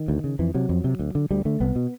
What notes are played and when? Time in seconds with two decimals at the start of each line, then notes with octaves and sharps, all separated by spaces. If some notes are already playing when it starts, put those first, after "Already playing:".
Already playing: D#3
0.08 D2
0.24 C#3
0.39 F2 E3
0.54 C3 F#3
0.69 F2
0.84 C3
0.99 D2
1.15 D3
1.31 D2 G3
1.45 D3 A3
1.60 C2 B3
1.76 B2